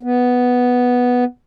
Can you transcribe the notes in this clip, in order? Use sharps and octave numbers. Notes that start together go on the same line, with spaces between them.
B3